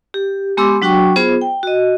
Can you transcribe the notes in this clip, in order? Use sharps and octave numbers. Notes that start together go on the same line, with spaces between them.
G4
G#3 B3 G4 C6 D6 E6
F#3 D4 F#4 G5 C#6
B3 F4 G#4 C5
G5
F#4 D#5